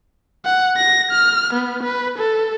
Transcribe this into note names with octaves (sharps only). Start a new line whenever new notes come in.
F#5
A#6
F6
B3
B4
A4